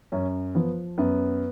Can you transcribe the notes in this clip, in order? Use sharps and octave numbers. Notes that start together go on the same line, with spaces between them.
F#2 C#4
F3 B3
F#2 B3